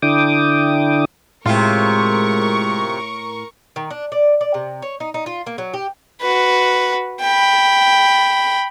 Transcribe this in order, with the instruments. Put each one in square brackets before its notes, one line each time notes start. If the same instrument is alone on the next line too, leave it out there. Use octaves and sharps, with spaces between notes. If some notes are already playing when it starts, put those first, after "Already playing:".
[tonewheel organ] D3 D4 E4 G5 D6 D#6
[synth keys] A2 [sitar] C3 F4 [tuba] G#3 [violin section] A#4 C#6
[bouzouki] D#3
D4
D5
D5
C3
C#5
D#4
D#4
F4
A#3
F#3
G4
[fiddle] F#4 B4
G5 B5